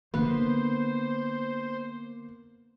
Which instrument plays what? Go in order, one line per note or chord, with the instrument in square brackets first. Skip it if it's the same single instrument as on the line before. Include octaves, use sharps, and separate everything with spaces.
[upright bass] D3 D4 [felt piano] A#3 [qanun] B3 [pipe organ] C5